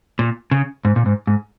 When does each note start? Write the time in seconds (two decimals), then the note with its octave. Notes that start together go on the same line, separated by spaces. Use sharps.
0.19 A#2
0.51 C#3
0.85 G#2
0.96 A#2
1.06 G#2
1.27 G#2